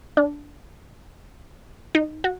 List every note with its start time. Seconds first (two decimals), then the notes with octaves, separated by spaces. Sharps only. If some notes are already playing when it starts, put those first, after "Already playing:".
0.17 D4
1.95 D#4
2.24 F#4